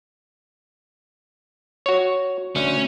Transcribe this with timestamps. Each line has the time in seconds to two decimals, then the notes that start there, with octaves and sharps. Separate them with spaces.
1.86 F#4 C#5
2.56 D2 C#4